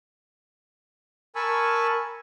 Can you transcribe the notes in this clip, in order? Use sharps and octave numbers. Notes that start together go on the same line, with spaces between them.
A#4 G#5 A5 B5 C#6 E6